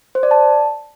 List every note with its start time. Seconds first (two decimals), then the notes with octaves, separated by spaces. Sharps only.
0.15 C5
0.23 D5
0.31 A5